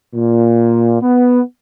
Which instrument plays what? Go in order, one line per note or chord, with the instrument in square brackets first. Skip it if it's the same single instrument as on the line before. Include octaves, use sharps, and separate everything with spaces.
[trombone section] A#2
B3